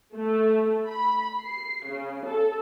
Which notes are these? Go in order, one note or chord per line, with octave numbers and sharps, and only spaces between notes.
A3
B5
C7
C#3
A4